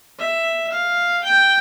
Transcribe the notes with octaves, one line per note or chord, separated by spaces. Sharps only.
E5
F5
G5